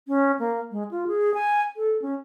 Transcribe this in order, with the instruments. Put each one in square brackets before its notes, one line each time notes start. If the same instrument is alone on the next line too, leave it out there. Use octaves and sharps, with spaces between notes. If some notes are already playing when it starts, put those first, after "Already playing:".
[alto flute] C#4
A#3
G#3
F4
G#4
G#5
A4
C#4